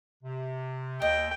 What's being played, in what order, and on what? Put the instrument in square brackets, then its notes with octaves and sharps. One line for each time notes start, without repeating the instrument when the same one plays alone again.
[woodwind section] C3
[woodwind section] D#2 [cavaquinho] D#5 [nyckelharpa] G5